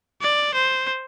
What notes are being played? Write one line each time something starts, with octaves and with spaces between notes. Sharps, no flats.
D5
C5